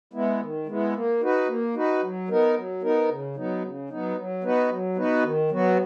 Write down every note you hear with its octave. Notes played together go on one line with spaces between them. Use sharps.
G#3 B3 E4
D#3
G#3 B3 E4
A#3
D#4 F#4 B4
A#3
D#4 F#4 B4
F#3
B3 D#4 A#4
F#3
B3 D#4 A#4
C#3
F#3 B3 D#4
C#3
F#3 B3 D#4
F#3
B3 D#4 F#4 B4
F#3
B3 D#4 F#4 B4
D#3
F#3 B3 F#4